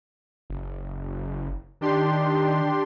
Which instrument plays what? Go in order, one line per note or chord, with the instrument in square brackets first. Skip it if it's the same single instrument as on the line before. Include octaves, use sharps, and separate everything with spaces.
[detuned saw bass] F#1
[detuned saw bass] D#3 [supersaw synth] D4 G4 C6